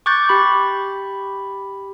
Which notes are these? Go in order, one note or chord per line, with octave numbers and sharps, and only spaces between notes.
C#6 D6 F#6 G6 A6
G4 B5